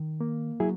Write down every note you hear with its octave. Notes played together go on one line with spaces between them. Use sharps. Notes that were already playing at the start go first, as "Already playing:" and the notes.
Already playing: D#3
A#3
F#3 E4 G#4